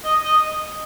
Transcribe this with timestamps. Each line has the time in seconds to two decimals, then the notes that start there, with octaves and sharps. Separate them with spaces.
0.04 D#5
0.25 D#5